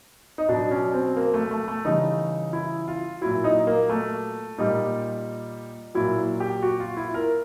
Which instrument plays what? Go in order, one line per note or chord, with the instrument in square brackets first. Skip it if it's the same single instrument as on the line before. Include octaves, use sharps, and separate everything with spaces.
[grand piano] D#4
B2 F#3 D4
C#4
C4
A#3
A3
A3
A3
C#3 E3 G3 D#4
E4
F4
A#2 F#3 E4
D#4
A#3
A3
A#2 G3 D#4
A#2 F#3 E4
G4
F#4
F4
E4
A#4